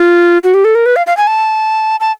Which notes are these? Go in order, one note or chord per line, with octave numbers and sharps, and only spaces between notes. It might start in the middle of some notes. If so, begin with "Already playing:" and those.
Already playing: F4
F#4
G4
A4
A#4
B4
F5
F5
G#5
A5
A5